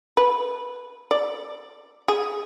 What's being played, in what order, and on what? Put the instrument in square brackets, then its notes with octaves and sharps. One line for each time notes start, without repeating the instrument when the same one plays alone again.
[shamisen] B4
D5
G#4